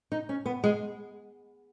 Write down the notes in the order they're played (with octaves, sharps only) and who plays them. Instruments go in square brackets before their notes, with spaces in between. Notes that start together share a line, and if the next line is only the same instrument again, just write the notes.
[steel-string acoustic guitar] D#4
C#4
B3
G#3